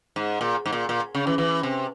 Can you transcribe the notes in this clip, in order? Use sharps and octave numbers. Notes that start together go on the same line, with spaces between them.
G#2
A#2
G#2
A#2
A#2
C#3
E3
E3
C3